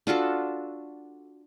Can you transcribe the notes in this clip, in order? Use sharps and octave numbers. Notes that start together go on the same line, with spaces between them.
D4 F4 F#4 A4